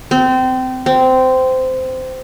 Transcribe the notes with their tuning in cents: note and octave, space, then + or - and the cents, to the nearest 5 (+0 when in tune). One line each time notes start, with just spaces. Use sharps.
C4 -25
C4 -15